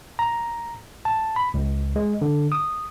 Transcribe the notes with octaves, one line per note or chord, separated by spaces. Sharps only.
A#5
A5
B5
C#2
G#3
D3
D#6